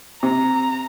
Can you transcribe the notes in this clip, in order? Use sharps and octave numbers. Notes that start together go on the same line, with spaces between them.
C3 A#5